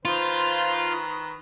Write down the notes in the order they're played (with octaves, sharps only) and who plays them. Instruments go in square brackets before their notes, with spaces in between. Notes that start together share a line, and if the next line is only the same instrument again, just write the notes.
[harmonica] D#3 B4 [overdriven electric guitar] F4 [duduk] C5